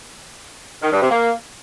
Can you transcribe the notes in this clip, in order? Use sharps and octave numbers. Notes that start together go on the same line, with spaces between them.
D#3
G2
C3
A#3